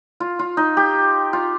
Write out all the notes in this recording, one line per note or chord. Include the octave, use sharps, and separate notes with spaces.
F4
F4
D#4
G4
F4